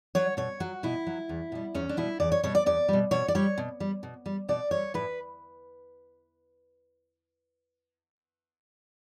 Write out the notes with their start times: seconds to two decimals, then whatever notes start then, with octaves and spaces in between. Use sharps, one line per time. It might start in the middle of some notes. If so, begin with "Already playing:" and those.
0.15 F#3 C#5
0.37 B2 C#5
0.60 F#3 F#4
0.83 B2 E4
1.07 F#3
1.29 E2
1.52 B2 G3
1.74 E2 C#4
1.89 D4
1.97 B2 G3 E4
2.20 E2 D5
2.32 C#5
2.43 B2 G3 C#5
2.55 D5
2.66 E2 D5
2.88 B2 G3
3.11 B2 C#5
3.28 D5
3.35 G3 C#5
3.58 B2
3.80 G3
4.03 B2
4.26 G3
4.49 B2 D5
4.71 G3 C#5
4.94 A2 B4